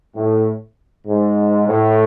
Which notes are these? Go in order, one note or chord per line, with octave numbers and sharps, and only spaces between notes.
A2
G#2
A2